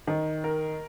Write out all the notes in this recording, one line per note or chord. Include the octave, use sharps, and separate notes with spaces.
D#3
A#4